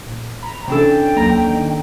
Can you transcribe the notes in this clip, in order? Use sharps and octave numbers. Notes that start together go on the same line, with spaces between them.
A#2
A#5 B5
C3 E3 C#4 D4 A4 G5
D2 F#3 A#3 A#5
D#3 A#3